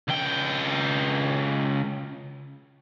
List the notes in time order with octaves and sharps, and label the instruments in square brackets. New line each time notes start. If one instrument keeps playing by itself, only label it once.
[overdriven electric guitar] C#2 G5